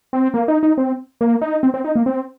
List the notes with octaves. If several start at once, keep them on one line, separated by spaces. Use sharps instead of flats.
C4
A#3
D#4
D#4
C4
A#3
D#4
C4
C4
D#4
A#3
C4